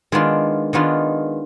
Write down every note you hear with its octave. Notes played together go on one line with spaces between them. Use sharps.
D#3 G#3 B3 D4 F4
D#3 G#3 B3 D4 F4